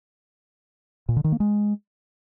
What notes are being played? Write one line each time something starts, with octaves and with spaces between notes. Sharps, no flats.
A#2
D3
D#3
A#3
G#3